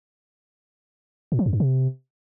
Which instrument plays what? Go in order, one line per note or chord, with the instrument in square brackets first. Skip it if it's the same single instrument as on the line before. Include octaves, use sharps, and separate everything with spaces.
[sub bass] A#2
F3
F#2
G2
C3